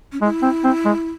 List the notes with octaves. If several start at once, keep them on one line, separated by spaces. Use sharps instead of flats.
C#4
G#3 E4
C4
C4
G#3